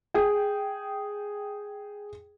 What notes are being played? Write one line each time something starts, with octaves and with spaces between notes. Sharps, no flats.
G#4 G5